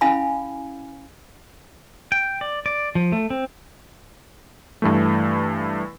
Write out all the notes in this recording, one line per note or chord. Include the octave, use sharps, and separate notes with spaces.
C#4 E4 F5 G#5 B5
G5
D5
D5
F3
A3
C4
G2 E3 A3